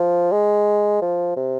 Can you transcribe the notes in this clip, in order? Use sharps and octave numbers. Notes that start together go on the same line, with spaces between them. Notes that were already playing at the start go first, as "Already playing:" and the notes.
Already playing: F3
G#3
F3
C3